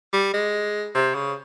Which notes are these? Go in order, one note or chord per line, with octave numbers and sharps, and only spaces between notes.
G3
G#3
C3
C#3